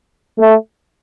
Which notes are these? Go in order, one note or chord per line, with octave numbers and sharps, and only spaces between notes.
A3